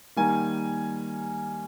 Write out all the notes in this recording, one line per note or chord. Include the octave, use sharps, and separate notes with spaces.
D#3 G3 A#3 G#5